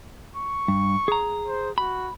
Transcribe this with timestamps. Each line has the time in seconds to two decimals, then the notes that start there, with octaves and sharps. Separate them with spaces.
0.36 C#6
0.68 G2
1.08 G#4 A#5
1.47 C5
1.78 F#4 B5